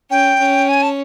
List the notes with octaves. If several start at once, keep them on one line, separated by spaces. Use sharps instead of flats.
C#4 G5
C#4
G#5
A5